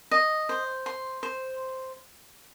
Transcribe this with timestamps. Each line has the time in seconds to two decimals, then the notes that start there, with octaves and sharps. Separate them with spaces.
0.11 D#5
0.49 C5
0.86 C6
1.23 C5